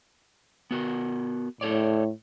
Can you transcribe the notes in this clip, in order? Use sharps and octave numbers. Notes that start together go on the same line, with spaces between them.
B3 F#4 A#4
A2 A4 C#5 D5